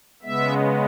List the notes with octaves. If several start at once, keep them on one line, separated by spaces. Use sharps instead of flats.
C#3 G#3 B3 E5